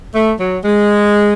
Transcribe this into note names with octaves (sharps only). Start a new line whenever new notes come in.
A3
F#3
G#3